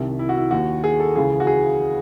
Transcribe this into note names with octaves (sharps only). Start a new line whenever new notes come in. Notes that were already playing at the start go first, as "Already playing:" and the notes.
Already playing: C2 C3 D#3
E4
F#4
E4
D#2 D#3 F#4
G#4
A4
C#2 C#3 E3 G#4
F#4
G#4